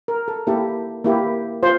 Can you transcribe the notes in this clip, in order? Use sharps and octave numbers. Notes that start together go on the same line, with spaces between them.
A#4
A4
A#3 E4 G4 A4
A#3 E4 G4
F4 C5